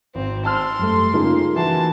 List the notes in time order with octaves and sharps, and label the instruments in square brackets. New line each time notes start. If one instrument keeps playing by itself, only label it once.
[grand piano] G#1 [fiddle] C4
[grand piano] A5 E6 F6 [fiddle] C6
[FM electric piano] F#2 G3 A3
[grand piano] C#3 A#3 [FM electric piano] D#4 F4 G#4
[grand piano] E3 F#4 [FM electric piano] E5 [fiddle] A5